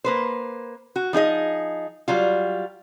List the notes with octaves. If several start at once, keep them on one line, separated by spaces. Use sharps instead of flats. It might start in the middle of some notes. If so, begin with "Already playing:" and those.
A#3 B4 C5
F#4
F3 D#4 G#4 D#5
F#3 G3 F4